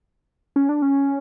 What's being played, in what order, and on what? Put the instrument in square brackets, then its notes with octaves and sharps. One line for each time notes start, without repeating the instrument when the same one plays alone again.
[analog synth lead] C#4
D4
C#4